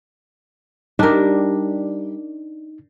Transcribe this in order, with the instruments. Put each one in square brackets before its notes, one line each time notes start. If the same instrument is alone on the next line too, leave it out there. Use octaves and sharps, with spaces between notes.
[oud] G3 G4 [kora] D4 A#4 [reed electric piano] D#4